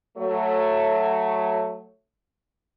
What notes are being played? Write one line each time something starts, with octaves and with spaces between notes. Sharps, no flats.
F#3 A3